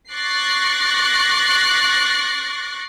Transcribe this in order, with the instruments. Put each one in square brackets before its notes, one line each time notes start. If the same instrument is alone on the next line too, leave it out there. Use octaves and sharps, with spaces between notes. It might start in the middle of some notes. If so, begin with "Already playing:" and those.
[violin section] C#6 D6 F#6 A6 A#6 C7